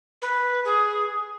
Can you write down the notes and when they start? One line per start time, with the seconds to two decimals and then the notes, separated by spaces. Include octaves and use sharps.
0.22 B4
0.65 G#4